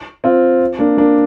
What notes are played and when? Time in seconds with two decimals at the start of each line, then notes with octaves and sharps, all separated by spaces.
0.24 C4 F4
0.79 A#3 D4
0.97 A#3 D4